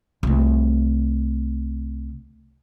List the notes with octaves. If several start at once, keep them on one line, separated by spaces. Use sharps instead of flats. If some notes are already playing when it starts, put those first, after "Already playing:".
C2 A3